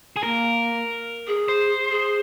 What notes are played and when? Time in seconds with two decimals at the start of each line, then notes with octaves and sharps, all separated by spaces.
0.16 G#4
0.23 A#3 A#4
1.28 G#4
1.48 C5
1.90 G#4